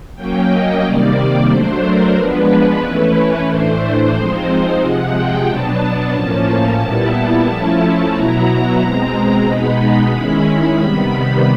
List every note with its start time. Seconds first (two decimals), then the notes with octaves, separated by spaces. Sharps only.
0.15 F#3 A#3 C#4 G5
0.49 D#5
0.82 C3 D#3 G3 A#3 D5
1.48 F#3 A3 D4 C5
1.81 A#4
2.14 F3 G#3 B3 D4 B4
2.81 E3 A3 C#4 E4
3.47 A2 E3 A3 D4 C5
4.13 F3 G#3 C4 D#4
4.80 C3 F3 G#3 F#5
5.14 G5
5.47 B2 F#3 B3 D4 A5
6.13 A2 F3 A#3 C#4
6.79 A#2 G3 B3 E4
7.47 F3 A3 C#4 E4
8.12 B2 F#3 B3 E4 A#5
8.78 B2 G#3 C4
9.45 B2 G#3 B3 D#4 B5
10.11 D#3 G#3 C#4 E4
10.77 C3 D#3 G3 B3 B5